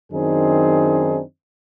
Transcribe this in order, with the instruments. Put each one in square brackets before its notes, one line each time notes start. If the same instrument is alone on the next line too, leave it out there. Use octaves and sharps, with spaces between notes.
[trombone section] F#2 D#3 C4 D4 D#4 G#4